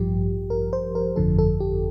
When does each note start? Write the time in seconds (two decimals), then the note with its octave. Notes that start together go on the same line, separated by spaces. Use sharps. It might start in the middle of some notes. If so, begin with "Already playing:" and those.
Already playing: A1 G2 F3 G4
0.50 A#4
0.73 C5
0.95 A#4
1.16 G1 F2 D3 F3 A4
1.38 A4
1.60 G4